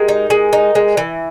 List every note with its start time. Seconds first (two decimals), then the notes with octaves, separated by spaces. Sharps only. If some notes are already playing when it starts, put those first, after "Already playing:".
Already playing: G#3 G4 A#4
0.09 D#4
0.30 G#3
0.53 D#4
0.75 G#3
0.97 E3